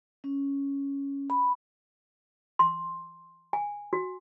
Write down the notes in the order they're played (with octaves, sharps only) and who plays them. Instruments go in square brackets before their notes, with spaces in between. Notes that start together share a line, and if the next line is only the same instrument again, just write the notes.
[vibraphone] C#4
B5
[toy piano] C6
G#5
F#4